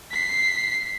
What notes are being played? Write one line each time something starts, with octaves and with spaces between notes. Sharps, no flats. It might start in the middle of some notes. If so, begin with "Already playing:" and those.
B6 C7